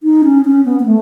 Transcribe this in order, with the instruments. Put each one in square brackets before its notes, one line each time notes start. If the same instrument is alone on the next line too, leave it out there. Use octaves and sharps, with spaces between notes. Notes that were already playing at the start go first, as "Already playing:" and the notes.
[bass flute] D#4
C#4
C#4
B3
B3
A3